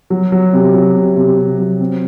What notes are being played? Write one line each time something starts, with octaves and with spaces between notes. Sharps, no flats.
F#3
F#3
C3
F#3
C3
C3
C3
F#3
C4